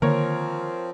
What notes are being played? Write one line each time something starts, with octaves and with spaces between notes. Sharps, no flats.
D3 D#3 F3 A#3 C4 A#4 C#5